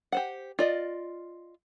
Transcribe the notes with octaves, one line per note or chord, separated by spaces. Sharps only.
G4 C5 F#5
F4 D5 D#5